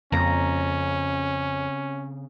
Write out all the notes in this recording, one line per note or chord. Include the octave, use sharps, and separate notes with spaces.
F2 C#3 A#3 C4 C#4 A#5